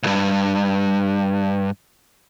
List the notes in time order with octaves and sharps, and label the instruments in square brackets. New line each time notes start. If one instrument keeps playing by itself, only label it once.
[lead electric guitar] C2 G2